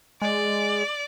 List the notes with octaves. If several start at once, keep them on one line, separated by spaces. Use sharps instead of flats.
G#3 D5